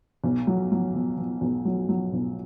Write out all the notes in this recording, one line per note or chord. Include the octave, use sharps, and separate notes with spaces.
B1
F#3
F#3
B2
B2
B1
F#3
F#3
B1